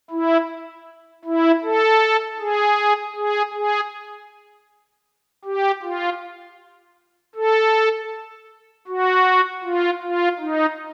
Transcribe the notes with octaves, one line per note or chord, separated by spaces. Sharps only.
E4
E4
A4
G#4
G#4
G#4
G4
F4
A4
F#4
F4
F4
D#4